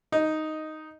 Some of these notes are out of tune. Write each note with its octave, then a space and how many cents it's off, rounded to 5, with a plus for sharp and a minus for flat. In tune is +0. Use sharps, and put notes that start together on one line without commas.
D#4 +0 D#5 +0